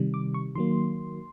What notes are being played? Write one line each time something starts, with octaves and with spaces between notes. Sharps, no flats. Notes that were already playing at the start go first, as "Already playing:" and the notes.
Already playing: C3 D#3 G3
D6
C#6
D#3 F#3 A#3 C6